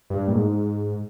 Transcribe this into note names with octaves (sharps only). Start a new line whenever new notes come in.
G2
A#2
G#2